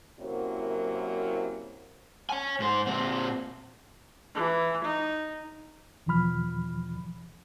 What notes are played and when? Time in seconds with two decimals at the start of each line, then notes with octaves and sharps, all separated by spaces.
0.20 F#2 C3 F#3 A#3 E4 C5
2.29 C#5 G#5
2.60 G#2 C5
2.87 A#2 C4
4.35 E3
4.84 D#4
6.06 E2 B2 E3 F3 B5 F6